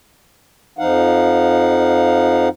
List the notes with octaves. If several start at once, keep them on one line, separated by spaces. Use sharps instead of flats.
F2 F3 D#4 F5 F#5